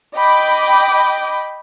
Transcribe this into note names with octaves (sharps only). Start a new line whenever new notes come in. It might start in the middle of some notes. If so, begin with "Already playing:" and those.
D#5 G5 B5 D6